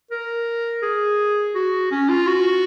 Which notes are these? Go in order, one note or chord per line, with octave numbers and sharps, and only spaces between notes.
A#4
G#4
F#4
C#4
F4
F#4